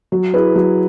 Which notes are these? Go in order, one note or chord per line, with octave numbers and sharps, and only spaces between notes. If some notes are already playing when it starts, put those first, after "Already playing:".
F#3
E4 G#4 B4
F#3